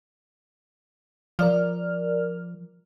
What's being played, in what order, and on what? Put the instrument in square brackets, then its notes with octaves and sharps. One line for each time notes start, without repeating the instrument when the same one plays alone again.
[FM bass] F3 [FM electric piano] A#4 D5 F6